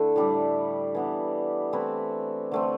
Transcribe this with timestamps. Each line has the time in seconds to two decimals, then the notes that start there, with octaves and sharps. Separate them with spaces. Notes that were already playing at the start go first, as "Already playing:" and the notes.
Already playing: D3 A3 E4
0.16 A2 G3 D4 G4
0.95 E3 B3 D4
1.72 E3 A3 C4 E4
2.52 D3 A3 C4